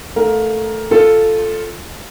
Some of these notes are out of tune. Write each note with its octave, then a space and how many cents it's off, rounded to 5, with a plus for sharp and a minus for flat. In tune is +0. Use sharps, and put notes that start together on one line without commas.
A3 +0 A#4 +10 F5 +25
F4 +0 A4 +0